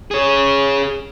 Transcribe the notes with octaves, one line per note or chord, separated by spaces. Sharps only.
G#4 C#5